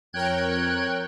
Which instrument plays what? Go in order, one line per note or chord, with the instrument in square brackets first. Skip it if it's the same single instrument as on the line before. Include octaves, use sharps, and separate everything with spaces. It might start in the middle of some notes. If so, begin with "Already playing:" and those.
[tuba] F2 [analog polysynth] A#4 C#5 G5 [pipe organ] F#6 G#6